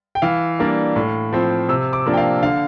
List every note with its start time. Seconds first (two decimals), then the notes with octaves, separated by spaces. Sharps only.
0.15 G5
0.22 E3 F5
0.59 G3 A#3 D4
0.96 A2
1.33 F3 C4
1.69 C3 E6
1.93 D6
2.06 F3 A#3 D4
2.13 G5
2.17 F5
2.42 D3 F5